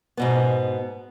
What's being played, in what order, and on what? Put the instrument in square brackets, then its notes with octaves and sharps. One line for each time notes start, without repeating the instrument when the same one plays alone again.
[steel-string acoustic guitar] G#2 B2 B3